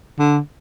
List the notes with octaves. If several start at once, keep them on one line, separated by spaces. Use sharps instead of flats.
D3